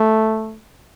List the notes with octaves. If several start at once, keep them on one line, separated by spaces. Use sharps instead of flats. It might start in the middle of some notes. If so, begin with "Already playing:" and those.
Already playing: A3